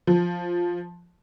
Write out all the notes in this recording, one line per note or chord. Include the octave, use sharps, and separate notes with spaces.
F3